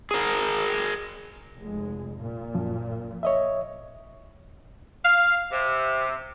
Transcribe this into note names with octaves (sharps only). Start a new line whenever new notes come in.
G#4 A#4
F1 G#3
A#2
F#2 F3
C#5 D#5 E5
F5
C3